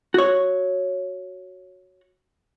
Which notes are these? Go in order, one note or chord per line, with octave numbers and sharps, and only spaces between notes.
F#4 C#5